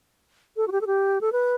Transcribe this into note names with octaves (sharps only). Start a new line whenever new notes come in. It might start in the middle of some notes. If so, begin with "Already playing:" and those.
A4
F#4
G4
A4
G4
A4
B4